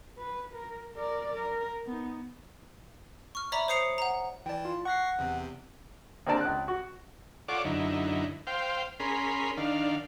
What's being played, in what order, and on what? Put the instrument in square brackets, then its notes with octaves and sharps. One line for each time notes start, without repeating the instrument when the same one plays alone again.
[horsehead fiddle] B4
A#4
A#4 D5
A#4
B3 D#4
[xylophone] C#6 F6
C#5 D5 E5 A#5 B5 D6
C5 C#5 D#6 C7 C#7 F7
F#5 A#5
[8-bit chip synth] E3 A5 [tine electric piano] D5 G5
[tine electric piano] F4
[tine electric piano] F#5 F#6 [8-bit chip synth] C#6 A#6 C7
[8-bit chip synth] E2 C3
[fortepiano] A#3 C4 D4 D5 A5
C#2 F#6
F#4
[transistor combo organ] F4 A4 C#5 D5 F#5 D6
F#2 D3 D#4 E4
C5 F5 G5
C#4 G#4 A#4 B5 C6
D#3 D4 F5